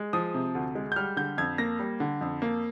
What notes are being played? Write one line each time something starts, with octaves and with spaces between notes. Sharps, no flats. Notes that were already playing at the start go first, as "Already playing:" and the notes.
Already playing: G#3
F3 D#6
C3
D2
G#3
G6
G3 F6
D3 G6
F2 G#6
A#3 A#6
G3
D3
F2
A#3